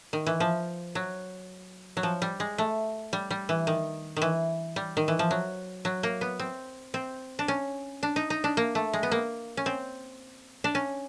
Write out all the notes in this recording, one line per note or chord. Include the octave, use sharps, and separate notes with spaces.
D#3
E3
F3
F#3
F#3
F3
G3
G#3
A3
G3
G3
E3
D#3
D#3
E3
G3
D#3
E3
F3
F#3
F#3
A#3
B3
C4
C4
D4
C#4
D4
D#4
D#4
D4
A#3
A3
G#3
B3
A#3
C#4
C4
D4
C#4